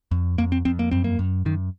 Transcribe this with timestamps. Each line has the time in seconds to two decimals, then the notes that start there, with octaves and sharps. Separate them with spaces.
0.11 F2
0.38 F2 A#3
0.52 C4
0.65 F2 C4
0.79 A#3
0.91 F#2 C4
1.04 A#3
1.19 F#2
1.45 F#2 D#3